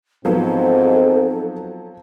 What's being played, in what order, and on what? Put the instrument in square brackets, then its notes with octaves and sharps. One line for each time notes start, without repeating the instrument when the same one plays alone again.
[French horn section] G#2 C4 [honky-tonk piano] F3 F#3 [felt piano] B3 D#4 B4 [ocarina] A4